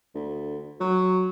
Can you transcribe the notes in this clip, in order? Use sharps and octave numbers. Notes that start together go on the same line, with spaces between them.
D2
F#3